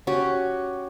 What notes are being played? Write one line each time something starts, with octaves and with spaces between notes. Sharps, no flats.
C#4 F#4 G4